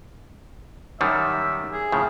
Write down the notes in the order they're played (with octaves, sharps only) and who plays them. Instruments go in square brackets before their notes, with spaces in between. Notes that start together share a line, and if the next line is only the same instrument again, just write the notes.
[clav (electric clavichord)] F#2 D#3 G3 [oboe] E5
[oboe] G#4
[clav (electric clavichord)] A2 C#3 F3